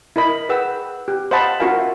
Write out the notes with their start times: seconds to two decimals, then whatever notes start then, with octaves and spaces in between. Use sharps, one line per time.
0.16 E4 A#4 D#5 B5
0.49 G#4 B4 F#5 G5 E6
1.08 G4
1.31 C5 D#5 F5 F#5 A5 B5
1.60 C#4 F4 F#4 A#4 F5 G#5
1.78 E5